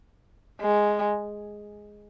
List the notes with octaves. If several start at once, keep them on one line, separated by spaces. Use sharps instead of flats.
G#3